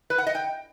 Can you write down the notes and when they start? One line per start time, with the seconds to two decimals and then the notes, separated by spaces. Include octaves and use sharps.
0.10 B4
0.18 F#5
0.27 D#5
0.35 G5